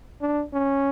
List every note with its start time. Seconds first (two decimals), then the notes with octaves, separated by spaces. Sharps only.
0.21 D4
0.53 C#4